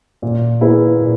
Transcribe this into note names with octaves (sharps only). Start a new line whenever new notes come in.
A#2
A#3 E4 G#4 B4
A#2